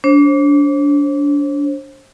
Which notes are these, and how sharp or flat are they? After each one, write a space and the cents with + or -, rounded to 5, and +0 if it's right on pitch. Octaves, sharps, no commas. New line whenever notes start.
D4 -30 C5 +35